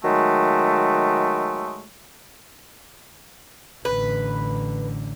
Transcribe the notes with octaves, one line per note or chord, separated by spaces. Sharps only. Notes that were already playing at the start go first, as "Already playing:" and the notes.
D#3 F#3 G#3 A3
A1 D3 B4